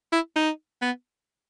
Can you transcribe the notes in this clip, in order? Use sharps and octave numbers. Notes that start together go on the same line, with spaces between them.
E4
D#4
B3